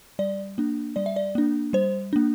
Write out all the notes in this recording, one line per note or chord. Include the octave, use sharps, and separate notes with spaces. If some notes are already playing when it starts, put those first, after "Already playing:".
G3 D5
A#3 D4
G3 D5
E5
D5
A#3 D4
G3 C5
A#3 D4